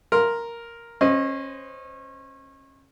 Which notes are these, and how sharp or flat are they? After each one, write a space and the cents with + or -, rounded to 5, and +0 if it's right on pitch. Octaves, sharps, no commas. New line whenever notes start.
A#4 +0 C6 +0
C#4 -30 C5 -15 D#5 +0